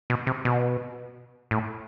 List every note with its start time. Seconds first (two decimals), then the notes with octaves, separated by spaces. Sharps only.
0.10 B2
0.27 C3
0.45 B2
1.51 A2